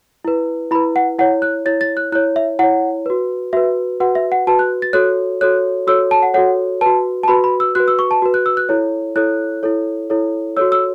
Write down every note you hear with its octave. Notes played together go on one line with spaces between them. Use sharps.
E4 B4
E4 B4 B5
F#5
E4 C#5 F#5
F#6
E4 C#5 A6
A6
F#6
E4 C#5 F#6
E5
E4 C#5 F#5
F#4 B4
F#4 B4 E5
F#4 B4 F#5
E5
F#5
F#4 B4 A5
F#6
A6
F#4 A4 C#5 F#6
F#4 A4 C#5 F#6
F#4 A4 C#5 E6
A5
F#5
F#4 A4 C#5 F#5
F#4 B4 A5
A5
F#4 B4 B5
B5
E6
F#4 B4 F#6
E6
C#6
A5
F#4 B4
F#6
E6
F#6
E4 A4 C#5
E4 A4 C#5 F#6
E4 A4 C#5
E4 A4 C#5
F#4 A4 C#5 E6
E6